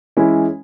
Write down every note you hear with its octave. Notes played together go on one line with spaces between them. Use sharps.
E3 G#3 C#4 E4